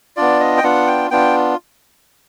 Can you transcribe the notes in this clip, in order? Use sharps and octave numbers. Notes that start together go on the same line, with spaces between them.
B3 D4 F4 D5
D#5
G5
B3 D4 F4 F#5
G5
B3 D4 F4 G5